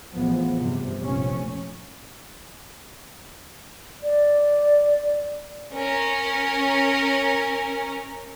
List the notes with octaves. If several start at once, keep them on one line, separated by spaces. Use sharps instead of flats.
A1 F3 G#3 B3
G2 C3
F1 A#1 F2 C#4
D5
C#4 A#4